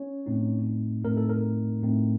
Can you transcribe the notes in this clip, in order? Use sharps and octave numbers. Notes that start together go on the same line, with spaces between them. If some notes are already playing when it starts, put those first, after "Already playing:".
Already playing: C#4 C#5
A2 A3 C4 D#4
A2 A3 C4 D#4 A#4
A4
A#4
A2 A3 C4 D#4